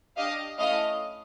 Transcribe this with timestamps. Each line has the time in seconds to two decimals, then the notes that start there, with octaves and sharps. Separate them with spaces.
0.17 D4 G4 D#5 F5
0.58 A3 C#4 E4 D#5 F5